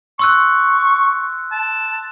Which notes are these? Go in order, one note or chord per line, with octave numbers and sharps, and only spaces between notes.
C6 C#6 E6 F#6
A5